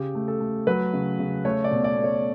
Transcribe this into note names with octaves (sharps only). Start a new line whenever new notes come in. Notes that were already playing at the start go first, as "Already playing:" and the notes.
Already playing: C#3 G4
A3
A4
A3
F#3 B4
C#3
C#3
A3 C#5
D5
B2
D5
A3
C#5